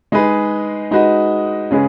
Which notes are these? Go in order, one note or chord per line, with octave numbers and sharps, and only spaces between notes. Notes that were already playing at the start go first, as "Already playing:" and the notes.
G#3 D#4 G#4 B4 D#5
G#3 D#4 F#4 B4 D#5
C#3 G#3 C#4 G#4 B4